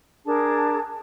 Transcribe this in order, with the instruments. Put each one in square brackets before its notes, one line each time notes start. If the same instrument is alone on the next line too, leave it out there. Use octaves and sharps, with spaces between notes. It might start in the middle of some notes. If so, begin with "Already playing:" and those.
[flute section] D4 G#4 A#4 A5